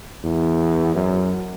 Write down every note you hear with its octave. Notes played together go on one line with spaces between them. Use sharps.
E2
F#2